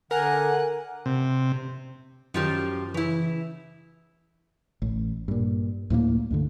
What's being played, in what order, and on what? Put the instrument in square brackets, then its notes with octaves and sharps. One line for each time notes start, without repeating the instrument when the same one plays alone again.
[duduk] D3 [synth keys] A#4 [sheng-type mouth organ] F#5 [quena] G#5
[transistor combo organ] C3
[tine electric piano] F#2 [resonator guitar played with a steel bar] D#3 F3 G4
[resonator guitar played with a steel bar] C#3 E4 [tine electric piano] E3
[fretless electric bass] A1
G2 A#2
D2 A2 F3 A#3
D2 G2 D3